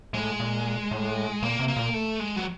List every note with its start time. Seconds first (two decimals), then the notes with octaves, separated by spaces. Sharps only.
0.13 A2 G#3
0.40 A#2
0.91 A2
1.42 A#2 A#3
1.59 C3
1.68 A#3
1.76 A#2
1.94 A3
2.20 G#3
2.36 F#3